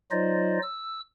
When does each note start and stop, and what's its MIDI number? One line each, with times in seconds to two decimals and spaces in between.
0.11 0.59 54
0.11 0.59 63
0.11 0.59 65
0.11 0.59 72
0.11 0.59 74
0.11 0.59 75
0.63 1.01 88